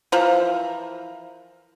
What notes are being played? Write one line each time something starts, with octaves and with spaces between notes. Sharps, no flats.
E3 F3 A#4